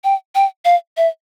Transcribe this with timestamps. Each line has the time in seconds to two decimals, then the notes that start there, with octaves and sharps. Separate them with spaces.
0.04 G5
0.35 G5
0.65 F5
0.97 E5